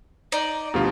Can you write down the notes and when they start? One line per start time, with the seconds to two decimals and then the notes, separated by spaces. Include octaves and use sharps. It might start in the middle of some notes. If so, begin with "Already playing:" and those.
0.32 D#4 D5
0.74 D2 B2 F3 F4 G4 F5